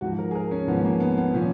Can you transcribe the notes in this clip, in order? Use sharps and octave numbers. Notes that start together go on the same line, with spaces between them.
G#2 F3 F#4
A#4
G#4
A#4
C#4
G#2 F3 B3
A#3
B3
B3
A#2 F3 C#4